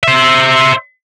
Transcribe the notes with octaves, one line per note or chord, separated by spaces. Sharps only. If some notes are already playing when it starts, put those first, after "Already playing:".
C5 E5